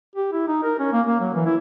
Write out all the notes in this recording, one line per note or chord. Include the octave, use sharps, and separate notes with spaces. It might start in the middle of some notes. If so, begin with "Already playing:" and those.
G4
E4
D#4
A#4
C#4
A#3
A#3
F#3
E3
E4